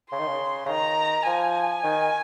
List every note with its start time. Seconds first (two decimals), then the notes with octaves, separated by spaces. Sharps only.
0.11 C#3 C6
0.19 D#3
0.27 C#3
0.66 C#3
0.68 D#3 A#5
1.26 F3 G#5
1.84 D#3